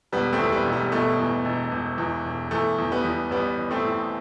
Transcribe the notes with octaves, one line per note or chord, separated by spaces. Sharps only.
E1 G3 B3
A3 C4
E2
G3 B3
E1
G3
B2 A3
E2
E1
E1
E2
E1
E2 A3
E2
G3 B3
E2
A1 G3 B3
A1
A3 C4
A2